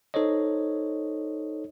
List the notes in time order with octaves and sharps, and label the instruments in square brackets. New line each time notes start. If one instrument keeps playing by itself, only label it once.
[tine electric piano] D#4 A4 C5 C#5 D#5